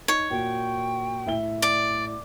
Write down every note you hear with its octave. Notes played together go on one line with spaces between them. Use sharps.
D#4 C#5
A#2 F#4 G5
A2 E5 G7
D5 D6